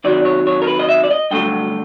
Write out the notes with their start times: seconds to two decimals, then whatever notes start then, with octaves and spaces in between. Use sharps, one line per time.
0.04 C3 D#3 F#3 D5
0.25 C#5
0.47 C#5
0.62 A#4
0.67 B4
0.79 D#5
0.89 E5
1.04 D5
1.11 D#5
1.31 G2 D3 F#3 A3 G5